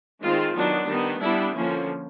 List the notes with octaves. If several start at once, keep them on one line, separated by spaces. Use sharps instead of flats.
D#3 G#3 C4 F4
D#3 F#3 B3 D4
D#3 G3 B3
G3 B3 D4 E4
D3 F3 A#3 C#4